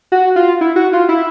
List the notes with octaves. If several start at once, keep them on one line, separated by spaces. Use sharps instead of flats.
F#4
F4
E4
F#4
F4
E4